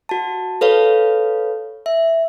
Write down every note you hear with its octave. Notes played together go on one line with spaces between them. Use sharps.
F#4 A5
A4 B4 C#5 F5
E5